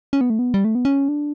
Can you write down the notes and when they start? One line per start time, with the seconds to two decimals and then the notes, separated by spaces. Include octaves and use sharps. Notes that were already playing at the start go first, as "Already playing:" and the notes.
0.13 C#4
0.21 B3
0.30 A3
0.39 B3
0.54 G3
0.65 A3
0.75 B3
0.85 C#4
1.08 D4